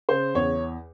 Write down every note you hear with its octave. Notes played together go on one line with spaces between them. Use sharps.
C#3 C5
E2 C#5